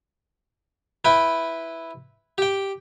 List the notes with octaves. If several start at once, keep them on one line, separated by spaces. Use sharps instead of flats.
E4 B4 G5
G4 G5